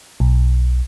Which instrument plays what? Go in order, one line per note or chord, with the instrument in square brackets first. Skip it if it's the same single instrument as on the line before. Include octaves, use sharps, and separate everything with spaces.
[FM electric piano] B1